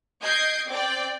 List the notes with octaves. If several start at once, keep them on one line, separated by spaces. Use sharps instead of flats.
D#5 G6 G#6 C7 D7
C4 D5 G5